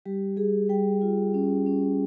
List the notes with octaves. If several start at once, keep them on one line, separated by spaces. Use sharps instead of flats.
G3 G4
G3 G#4
G3 G5
F4
C#4
C#4